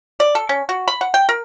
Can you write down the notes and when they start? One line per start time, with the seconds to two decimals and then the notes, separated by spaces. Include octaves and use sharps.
0.20 D5
0.35 A4
0.49 C#4
0.69 F#4
0.88 B5
1.01 F#5
1.14 G5
1.29 A#4